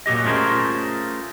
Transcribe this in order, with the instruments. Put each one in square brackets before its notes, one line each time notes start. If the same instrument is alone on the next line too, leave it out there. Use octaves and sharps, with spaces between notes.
[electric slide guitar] A#2 F#3 G4 D#5
A3 C#4 F4 G#4 A#4 C5